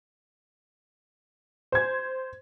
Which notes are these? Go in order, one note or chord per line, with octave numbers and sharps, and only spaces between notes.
C5 G#6